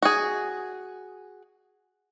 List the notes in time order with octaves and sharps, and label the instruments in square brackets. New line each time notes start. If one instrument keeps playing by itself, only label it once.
[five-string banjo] F#4 G#4